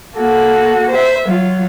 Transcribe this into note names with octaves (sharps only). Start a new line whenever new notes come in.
A#3 F#4 A4
C5 E5
F#3 F4